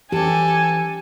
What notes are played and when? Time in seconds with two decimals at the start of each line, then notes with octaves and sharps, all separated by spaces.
0.12 E3 C#4 G4 A4 G#5